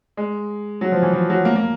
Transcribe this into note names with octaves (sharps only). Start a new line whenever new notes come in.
G#3
F#3
F3
E3
F3
F#3
A#3
A#3